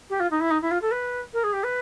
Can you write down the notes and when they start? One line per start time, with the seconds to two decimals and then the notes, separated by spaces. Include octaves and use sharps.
0.09 G4
0.20 F4
0.31 D#4
0.40 E4
0.50 D#4
0.61 E4
0.71 F4
0.81 A4
0.91 B4
1.33 A#4
1.43 G#4
1.53 G4
1.63 B4